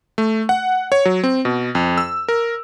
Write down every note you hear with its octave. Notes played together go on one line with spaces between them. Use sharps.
A3
F#5
C#5
F#3
C4
B2
F2
E6
A#4